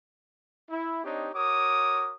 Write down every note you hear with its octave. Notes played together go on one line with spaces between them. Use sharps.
E4
C4 D4 D#4 G4 C#5 D#5
F#4 A#4 C#5 D6 D#6